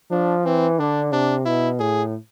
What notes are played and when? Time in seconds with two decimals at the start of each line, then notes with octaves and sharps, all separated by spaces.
0.11 F3 D4
0.45 E3 C4
0.79 D3 D4
1.12 C3 D4
1.46 B2 E4
1.79 A2 G#4